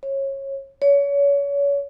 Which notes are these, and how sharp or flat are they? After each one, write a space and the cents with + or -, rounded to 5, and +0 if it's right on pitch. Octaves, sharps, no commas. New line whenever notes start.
C#5 -25
C#5 +30